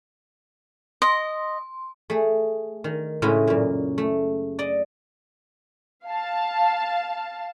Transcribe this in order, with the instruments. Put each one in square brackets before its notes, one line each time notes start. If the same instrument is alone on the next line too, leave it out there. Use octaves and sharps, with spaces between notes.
[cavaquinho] D#5 [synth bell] C6
[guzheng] A3 G#4
D#3
A2 C#3 G#3 E4 F#4 D#5
F#2 A#2
A3
D5 D#5
[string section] F5 A5